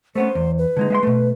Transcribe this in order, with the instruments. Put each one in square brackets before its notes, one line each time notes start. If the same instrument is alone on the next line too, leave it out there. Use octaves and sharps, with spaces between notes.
[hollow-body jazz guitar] A3 B3 C#4 [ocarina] C5
[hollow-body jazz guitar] E2
[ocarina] B4
[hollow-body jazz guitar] D3 G#3 D#4
G#3 E5 C6
B2 A3